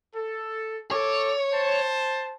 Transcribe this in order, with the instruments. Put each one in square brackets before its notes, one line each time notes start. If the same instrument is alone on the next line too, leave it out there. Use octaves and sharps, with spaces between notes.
[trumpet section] A4
[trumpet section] A4 D6 [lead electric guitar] C#5
[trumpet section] C5 A5